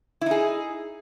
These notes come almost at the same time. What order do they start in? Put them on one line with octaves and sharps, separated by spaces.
E4 D#4 G#4